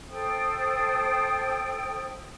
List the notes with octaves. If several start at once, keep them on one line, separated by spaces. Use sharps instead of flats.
A4 C5 G5 D#6